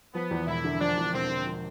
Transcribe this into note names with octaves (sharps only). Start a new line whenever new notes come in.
F3 B3
E2
E1 E4
D3
F3 D4
E2
E1 C4
D3
F3